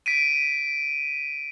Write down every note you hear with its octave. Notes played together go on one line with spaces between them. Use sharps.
B6 D7 D#7